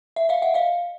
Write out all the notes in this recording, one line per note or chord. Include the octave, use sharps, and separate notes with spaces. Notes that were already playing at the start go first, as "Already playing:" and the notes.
E5
D#5 F5
E5 F#5
D#5 F5